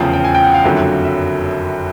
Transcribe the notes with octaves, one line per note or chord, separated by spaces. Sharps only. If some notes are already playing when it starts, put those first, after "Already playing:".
Already playing: F1 E2 C#3 F3 G5
G5
G#5
G5
F#5
F5
F#1 F2 D3 F#3 E5
E5